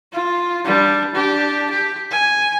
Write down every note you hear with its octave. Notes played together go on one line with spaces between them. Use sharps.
F4
G3 D4
D4 G4
G4
G#5